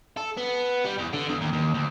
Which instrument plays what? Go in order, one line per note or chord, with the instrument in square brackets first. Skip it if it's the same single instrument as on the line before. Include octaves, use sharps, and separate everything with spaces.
[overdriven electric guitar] A4
B3
G3
E2
D3
E2
D#2
D#2
D2